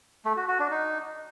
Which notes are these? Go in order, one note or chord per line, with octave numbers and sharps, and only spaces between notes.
A3
F#4
F#4
D4
D#4